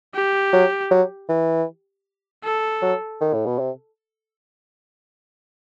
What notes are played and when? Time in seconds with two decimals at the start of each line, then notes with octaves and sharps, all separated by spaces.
0.15 G4
0.53 F#3
0.91 F#3
1.29 E3
2.44 A4
2.82 F#3
3.21 D#3
3.33 A2
3.46 B2
3.59 C3